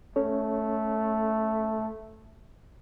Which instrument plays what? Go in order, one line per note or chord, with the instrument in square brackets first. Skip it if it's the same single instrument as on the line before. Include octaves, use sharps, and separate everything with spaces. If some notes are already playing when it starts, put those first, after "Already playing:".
[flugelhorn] A3 [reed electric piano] C#4 A4 C#5